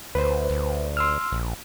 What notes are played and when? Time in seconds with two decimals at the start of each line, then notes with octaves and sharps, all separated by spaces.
0.15 D2 B4 C5
0.50 D2
0.97 C6 E6 F6
1.32 A#1